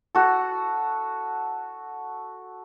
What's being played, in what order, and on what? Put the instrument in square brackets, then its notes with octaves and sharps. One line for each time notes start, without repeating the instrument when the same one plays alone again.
[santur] F#4 A4